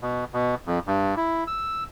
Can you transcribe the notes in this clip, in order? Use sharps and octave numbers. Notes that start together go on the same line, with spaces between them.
B2
B2
F2
G2
E4
E6